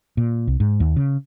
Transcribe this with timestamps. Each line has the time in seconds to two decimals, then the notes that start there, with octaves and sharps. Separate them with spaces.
0.17 A#2
0.47 C2
0.60 G#2
0.80 D#2
0.96 C#3